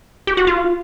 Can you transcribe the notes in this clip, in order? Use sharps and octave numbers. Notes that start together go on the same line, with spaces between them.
G4
F#4
F4